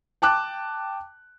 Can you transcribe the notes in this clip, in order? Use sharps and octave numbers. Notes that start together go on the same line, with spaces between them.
G5 A5 D6 F#6